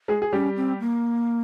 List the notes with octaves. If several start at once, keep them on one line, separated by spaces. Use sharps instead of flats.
G#3 G#4
G#4
G3 C#4 G4
C4
A#3